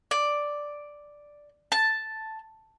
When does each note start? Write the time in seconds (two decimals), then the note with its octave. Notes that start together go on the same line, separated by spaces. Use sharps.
0.11 D5
1.72 A5